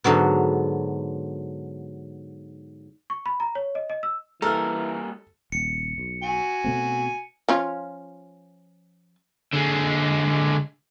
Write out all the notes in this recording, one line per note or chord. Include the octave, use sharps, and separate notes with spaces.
G#2 D3 F#3 B3
C#6
B5
A#5
C#5
D#5
D#5
E6
E3 G3 A#3 A4 A#4 F6
D#1 C#7
B1
F#4 G#5
B2 A3 C4
F3 C#4 F4
D3 G#3